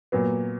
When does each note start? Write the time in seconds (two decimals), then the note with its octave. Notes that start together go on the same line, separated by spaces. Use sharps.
0.12 A#2 F#3 B3